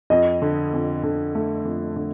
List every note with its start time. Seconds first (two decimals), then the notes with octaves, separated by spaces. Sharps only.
0.10 F2 D#5
0.42 D3
0.73 F2
1.03 D3
1.35 A3
1.65 F2
1.96 D3